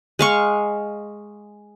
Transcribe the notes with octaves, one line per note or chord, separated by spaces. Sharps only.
G#3 F5 C#6